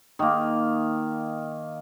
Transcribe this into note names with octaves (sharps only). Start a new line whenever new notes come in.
D#3 A#3